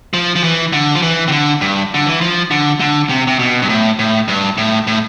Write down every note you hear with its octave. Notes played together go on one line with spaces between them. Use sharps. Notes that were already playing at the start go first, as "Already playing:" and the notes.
F3
F3
E3
D3
F3
E3
C3
D3
G2
D3
E3
F3
D3
D3
C3
C3
B2
G2
A2
A2
G2
A2
A2